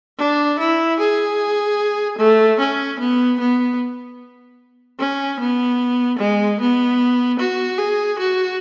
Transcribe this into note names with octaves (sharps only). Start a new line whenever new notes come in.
D4
E4
G#4
A3
C#4
B3
B3
C#4
B3
G#3
B3
F#4
G#4
F#4